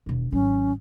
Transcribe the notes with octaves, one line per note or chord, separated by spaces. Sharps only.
E1 D#2
G#1 F#3 C#4